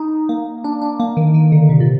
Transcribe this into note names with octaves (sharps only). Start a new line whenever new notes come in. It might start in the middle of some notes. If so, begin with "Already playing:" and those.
Already playing: D#4
A#3
D4
D4
A#3
D#3
D#3
D3
C3
A#2